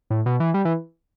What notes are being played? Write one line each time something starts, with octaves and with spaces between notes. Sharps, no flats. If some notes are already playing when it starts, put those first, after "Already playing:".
A2
B2
E3
G3
E3